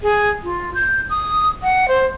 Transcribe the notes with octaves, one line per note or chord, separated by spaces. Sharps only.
G#4
F4
G6
D#6
F#5
C5